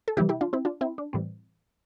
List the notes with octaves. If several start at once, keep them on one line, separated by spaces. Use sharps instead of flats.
A4
C3 E3 G3 E4 G4
E4 G4
D4 F4
C4 E4
D4 F4
C4 E4
D4
A2 E3 G3 C4